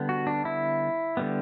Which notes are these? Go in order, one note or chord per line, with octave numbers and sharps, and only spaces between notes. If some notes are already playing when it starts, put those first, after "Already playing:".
Already playing: D3 G3 B3
F#4
D4
E4
D3 G3 B3